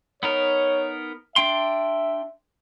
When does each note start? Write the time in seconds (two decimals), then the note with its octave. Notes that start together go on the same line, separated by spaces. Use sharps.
0.23 B3 D#4 A#4 C#5
1.36 D4 E5 G5 C6